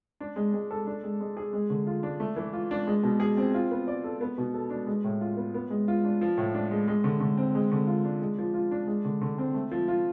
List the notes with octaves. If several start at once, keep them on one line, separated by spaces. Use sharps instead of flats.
D4
G#3
G#3
A4
D4
G#3
G#3
G#4
G#3
D3
F4
D4
A3
E3
F4
D4
G#3
B2
G#4
C4
F4
B3
D5
A4
B3
B2
A4
D4
G#3
A2
F4
B3
B3
G#3
F4
D4
F3
A2
D4
G#3
G#3
D3
D3
C4
G#3
D3
F4
D4
G#3
F3
F4
D4
G#3
D3
D3
C4
A3
F3
F4